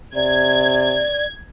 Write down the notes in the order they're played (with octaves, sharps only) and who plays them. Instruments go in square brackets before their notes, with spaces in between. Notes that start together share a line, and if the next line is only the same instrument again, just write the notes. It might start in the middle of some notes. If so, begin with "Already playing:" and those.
[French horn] C3 [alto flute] D5 [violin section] G#6